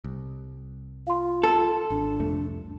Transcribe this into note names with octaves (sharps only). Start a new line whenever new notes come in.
C2
F4 F5 C6
A4
G#1 D4
C2 F2 A3